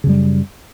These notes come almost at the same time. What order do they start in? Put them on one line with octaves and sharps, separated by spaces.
C#3 F#2 G3